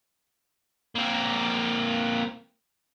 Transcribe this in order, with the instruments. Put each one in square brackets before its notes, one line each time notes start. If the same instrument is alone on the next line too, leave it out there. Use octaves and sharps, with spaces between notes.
[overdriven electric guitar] A#3 C4